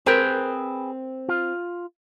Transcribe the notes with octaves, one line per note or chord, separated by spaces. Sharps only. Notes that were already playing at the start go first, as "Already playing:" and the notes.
C4 G#4 A#4 B4 G5
F4